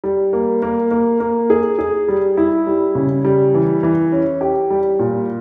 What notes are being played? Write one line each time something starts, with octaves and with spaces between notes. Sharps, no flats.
G3
A#3
A#3
A#3
A#3
G#4
G#4
G3
E4
G3
C#3
G3
E3
E3
C#4
G4
G3
A#2